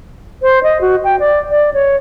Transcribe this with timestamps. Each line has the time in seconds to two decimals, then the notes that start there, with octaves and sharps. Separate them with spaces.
0.42 C5
0.63 D#5
0.81 F#4
1.04 G5
1.20 D5
1.50 D5
1.74 C#5